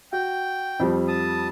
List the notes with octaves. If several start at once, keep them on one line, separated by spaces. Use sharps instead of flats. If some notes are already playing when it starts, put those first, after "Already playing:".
F#4 G5
F2 F3 G3
A5 D#6